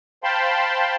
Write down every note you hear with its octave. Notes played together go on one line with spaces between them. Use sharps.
C5 F5 G5 A5 B5 C6